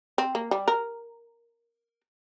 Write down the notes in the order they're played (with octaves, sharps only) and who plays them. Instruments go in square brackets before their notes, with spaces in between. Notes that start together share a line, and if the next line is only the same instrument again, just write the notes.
[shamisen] C4
A#3
G3
A#4